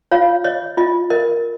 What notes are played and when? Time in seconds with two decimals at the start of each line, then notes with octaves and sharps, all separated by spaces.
0.11 F4 C#5 F5
0.44 C#5 D#5
0.77 F4 D#5
1.10 A#4 D#5